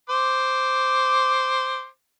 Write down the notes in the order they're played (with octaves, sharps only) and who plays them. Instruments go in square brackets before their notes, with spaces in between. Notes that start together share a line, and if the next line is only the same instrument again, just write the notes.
[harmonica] C5 D6